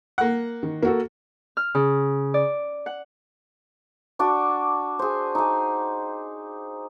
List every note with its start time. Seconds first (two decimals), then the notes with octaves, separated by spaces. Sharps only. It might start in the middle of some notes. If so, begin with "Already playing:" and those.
0.18 A#3 F#5
0.63 D#3
0.83 A#3 F#4 A4
1.57 F6
1.75 C#3
2.34 D5
2.86 F#5
4.19 D4 F#4 D5
4.99 G#4 C5
5.35 D#4 G#4